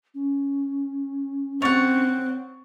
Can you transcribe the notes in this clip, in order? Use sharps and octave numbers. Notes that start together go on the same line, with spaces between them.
C#4
C4 C#5 F#5 C#6 A6 F7